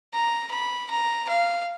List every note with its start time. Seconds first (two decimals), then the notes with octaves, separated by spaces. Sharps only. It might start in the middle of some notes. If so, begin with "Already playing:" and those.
0.14 A#5
0.51 B5
0.90 A#5
1.29 F5